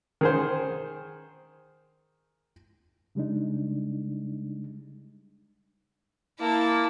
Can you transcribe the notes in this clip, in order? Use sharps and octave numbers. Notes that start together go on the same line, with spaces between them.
D#3 G#4 C5
C#3 G3 G#3 D4 D#4
A#3 E4 A5